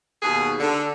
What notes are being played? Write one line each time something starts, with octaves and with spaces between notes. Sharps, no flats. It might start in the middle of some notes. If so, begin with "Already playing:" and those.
D#2 B2 G#4
D3